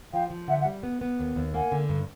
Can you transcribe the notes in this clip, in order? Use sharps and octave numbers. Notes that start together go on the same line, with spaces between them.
F3 F5 G5
F3
D3 E5 F#5
E5 F#5
G3
B3
B3
D#2
D#2
A#3 F#5 G#5
D3
G2